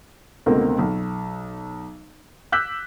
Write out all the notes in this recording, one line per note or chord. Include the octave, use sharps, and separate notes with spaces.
C#2 B2 D3 A3 A#3 C4
B1
D6 E6 F#6 G6 B6